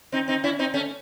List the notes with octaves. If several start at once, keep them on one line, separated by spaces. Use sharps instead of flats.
C4 D#4
C4 D#4
C#4 E4
C4 D#4
A3 C#4